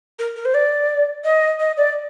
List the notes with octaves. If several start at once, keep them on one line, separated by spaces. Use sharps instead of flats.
A#4
A#4
C5
D5
D#5
D#5
D5